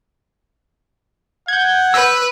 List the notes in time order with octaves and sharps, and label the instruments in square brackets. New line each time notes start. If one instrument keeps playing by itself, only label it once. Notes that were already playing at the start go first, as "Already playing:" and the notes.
[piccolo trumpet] F#5 [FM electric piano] G6 G#6
[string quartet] B4 [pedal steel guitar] E6